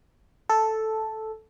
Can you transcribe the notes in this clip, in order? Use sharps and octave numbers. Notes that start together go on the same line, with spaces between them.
A4